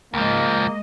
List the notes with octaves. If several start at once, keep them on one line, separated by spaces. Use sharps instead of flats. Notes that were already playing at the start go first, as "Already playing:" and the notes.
C#2 F3 G#3 A#3 D#5